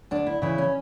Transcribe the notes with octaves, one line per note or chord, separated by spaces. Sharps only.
D2 D4
E4
C#3 E3 E4
C#4